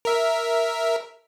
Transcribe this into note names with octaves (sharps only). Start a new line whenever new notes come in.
A#4 E5